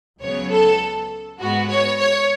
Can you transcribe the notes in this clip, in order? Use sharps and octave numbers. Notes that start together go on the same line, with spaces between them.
C#2 C#3 F#3 B3 C#5
A4
G#2 G#3 B3 F#4
C#5
C#5